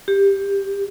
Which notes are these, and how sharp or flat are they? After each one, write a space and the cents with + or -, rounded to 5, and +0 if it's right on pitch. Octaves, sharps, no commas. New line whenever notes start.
G4 +15